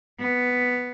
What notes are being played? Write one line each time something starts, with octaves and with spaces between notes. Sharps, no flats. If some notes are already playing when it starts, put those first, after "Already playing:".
B3